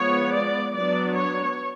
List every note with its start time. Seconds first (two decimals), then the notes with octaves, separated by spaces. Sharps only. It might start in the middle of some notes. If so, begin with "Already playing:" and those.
Already playing: F3 G#3 B3 C#5
0.33 D5
0.74 F#3 B3 D4 D5
1.15 C#5